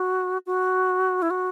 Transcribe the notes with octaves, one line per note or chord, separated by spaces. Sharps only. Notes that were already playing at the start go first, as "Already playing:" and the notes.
Already playing: F#4
F#4
E4
F#4